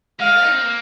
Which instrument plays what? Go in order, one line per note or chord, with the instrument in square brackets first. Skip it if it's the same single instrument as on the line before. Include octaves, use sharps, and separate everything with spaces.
[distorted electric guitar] G#3 [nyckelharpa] F5
[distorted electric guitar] D#4
C4
A#3